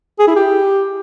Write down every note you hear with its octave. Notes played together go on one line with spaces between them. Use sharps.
G#4
E4
G4